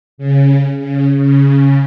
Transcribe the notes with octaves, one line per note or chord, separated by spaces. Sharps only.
C#3
C#3
C#3